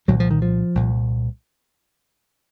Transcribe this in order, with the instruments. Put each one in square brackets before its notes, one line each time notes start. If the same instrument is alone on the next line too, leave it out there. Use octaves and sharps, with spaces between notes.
[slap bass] C2 A#2 D#3 F#3
F3
D#3
F3
C2 A#2